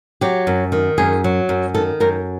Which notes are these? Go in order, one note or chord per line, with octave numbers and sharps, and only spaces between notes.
F#3 G4
F#2
D#3
F#2 G#4
F#3
F#2
D#3 A4
F#2 A#4